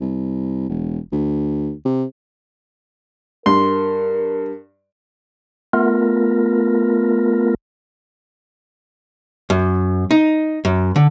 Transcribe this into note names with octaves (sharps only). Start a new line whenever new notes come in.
C2
E1
D2
C3
G2 A#4 C6
A3 B3 F4 A#4
F#2
D#4
F#2
D3